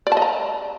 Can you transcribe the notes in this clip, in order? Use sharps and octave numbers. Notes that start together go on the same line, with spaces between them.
D5
A5
D#5
A#5